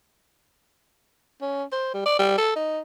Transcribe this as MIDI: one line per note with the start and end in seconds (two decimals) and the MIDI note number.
1.42 1.63 61
1.72 1.91 72
1.94 2.04 55
2.06 2.15 74
2.19 2.38 55
2.38 2.53 69
2.56 2.80 63